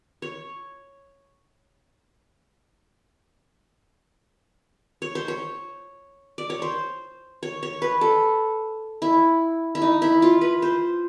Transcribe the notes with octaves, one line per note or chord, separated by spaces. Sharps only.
C#5
C#5
C5
C#5
D5
C#5
C5
C#5
C#5
B4
A4
E4
E4
D#4
E4
F4
B4
C5